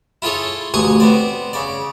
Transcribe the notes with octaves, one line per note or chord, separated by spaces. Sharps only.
E4 F4 G#4 A4 C#5
A1 D2 G#4 G#5 C#6 D#6
B3 C4 D5
C#3 D5